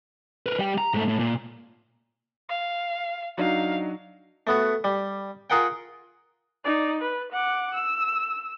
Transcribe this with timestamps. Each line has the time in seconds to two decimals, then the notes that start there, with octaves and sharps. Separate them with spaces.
0.46 A#4 B4
0.59 G3 G5
0.78 A#5
0.94 G#2 A3
1.08 A2
1.19 A#2
2.49 F5
3.38 F#3 D4 D#4 F5
4.47 A3 B3 F#4
4.84 G3
5.50 F4 G#4 A#4 F#5 G5
6.64 D#4 D5
7.01 B4
7.32 F#5 D6
7.74 E6